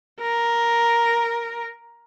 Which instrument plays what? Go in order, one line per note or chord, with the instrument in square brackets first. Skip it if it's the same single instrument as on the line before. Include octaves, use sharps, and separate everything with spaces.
[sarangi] A#4